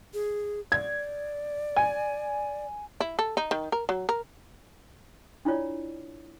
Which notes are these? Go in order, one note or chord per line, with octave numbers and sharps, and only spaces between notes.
G#4
D5 G#6
G#5
E4
A4
D#4
D#3
A#4
F#3
A#4
D4 E4 F4 C#5 D5